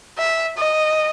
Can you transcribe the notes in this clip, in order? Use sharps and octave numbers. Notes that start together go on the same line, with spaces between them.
E5
D#5